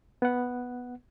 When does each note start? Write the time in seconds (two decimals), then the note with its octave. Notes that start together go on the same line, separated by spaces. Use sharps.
0.22 B3 F#5